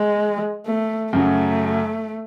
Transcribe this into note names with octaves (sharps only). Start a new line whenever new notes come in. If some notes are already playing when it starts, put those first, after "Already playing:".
Already playing: G#3
A3
F#2 C#3 F#3 A3